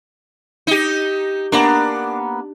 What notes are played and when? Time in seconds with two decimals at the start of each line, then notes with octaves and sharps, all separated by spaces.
0.67 D#4 G4
1.52 A#3 B3 D4 A#5